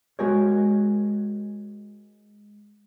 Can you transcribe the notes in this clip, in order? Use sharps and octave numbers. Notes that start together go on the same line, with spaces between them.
G#3 F#4 G#4 A#4 C#5